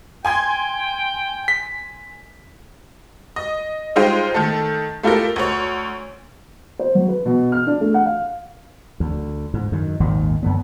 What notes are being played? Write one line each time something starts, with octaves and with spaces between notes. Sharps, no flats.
G5 G#5 C6 G#6
B6
D#5
G3 G#3 D#4 F4 C5 G5
D#3 A3 A4
A3 E4 F4 G4 A4 A#4
D2 C#5
C5
F#3
B4
B2
F6
D4
A3
F#5
F5
D2
G#2
F#2 D#3
G#1 D#2 A#2 D#3
F#2 D3 B3